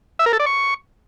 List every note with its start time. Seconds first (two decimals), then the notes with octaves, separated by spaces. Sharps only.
0.19 E5
0.26 A#4
0.33 A4
0.40 D5
0.46 C#6